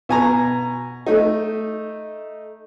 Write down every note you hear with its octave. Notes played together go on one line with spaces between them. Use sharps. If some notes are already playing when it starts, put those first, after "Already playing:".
B2 G#5 A#5
A3 D#4